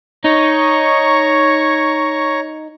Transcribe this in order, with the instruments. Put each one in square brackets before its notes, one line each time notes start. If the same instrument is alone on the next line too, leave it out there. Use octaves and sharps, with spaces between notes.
[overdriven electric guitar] D#4 [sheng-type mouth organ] C#5 A#5 C#6